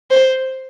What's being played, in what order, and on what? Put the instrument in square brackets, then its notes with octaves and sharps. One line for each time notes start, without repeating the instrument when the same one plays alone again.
[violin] C5